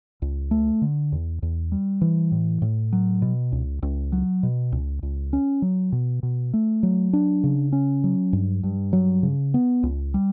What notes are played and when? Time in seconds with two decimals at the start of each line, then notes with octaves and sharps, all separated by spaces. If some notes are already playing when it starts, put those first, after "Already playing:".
0.22 C#2
0.51 A3
0.82 D3
1.12 E2
1.42 E2
1.72 G3
2.01 E3
2.32 A2
2.62 A2
2.93 F#3
3.22 B2
3.52 C#2
3.83 C#2
4.12 F#3
4.43 B2
4.72 C#2
5.03 C#2
5.33 C#4
5.62 F#3
5.92 B2
6.23 B2
6.53 A3
6.83 F#3
7.13 D4
7.44 C#3
7.72 C#4
8.04 F#3
8.33 G2
8.63 G2
8.93 F#3
9.23 C#3
9.54 B3
9.83 C#2
10.14 G3